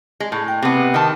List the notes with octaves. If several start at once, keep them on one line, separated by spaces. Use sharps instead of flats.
G#3
A2
G5
C3 B3
D#3 A5